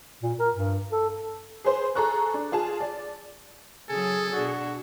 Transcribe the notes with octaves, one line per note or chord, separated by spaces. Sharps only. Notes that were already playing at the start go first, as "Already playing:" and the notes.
A#2
A#4
G2
A4
G#4 B4 C5 C6
G#4 A4 A#5 C#6 F#6
D4
F4 G#4 A5
D5
C#3 F#3 G#4 A4 G#5
B2 D4 F#4